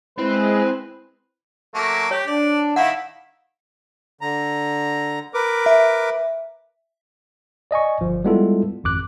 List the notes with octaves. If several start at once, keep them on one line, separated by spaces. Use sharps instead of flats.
G#3 C4 E4 B4
F#3 A3 A#3
G4 C#5
D4 D5
D#3 E4 F5 F#5
D3 A#5
A#4 B4 D6
E5
D5 D#5 G#5 C#6
G1 F3
G3 G#3 B3 E4 F4 A4
G#1 F2 D6 F#6